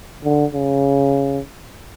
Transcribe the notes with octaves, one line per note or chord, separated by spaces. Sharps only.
D3
C#3